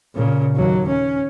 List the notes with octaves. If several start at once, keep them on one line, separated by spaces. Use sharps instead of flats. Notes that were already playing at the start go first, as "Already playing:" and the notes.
A#2 C#3
D#2 F#3
C#4